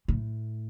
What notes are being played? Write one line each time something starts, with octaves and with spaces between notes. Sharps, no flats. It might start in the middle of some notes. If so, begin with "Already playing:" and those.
A2